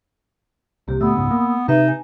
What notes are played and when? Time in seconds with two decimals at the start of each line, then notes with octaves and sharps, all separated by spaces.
0.88 C2 C3 A#3 G4
1.01 D2 A#2 A3 B3 B5 D#6 E6
1.15 F#1 C#2 G#2
1.31 A#3
1.68 C3 D#4 B4 E5
1.88 G#5